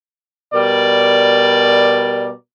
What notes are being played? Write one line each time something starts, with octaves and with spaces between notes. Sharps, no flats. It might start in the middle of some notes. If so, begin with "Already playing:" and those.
B2 G3 A#4 D5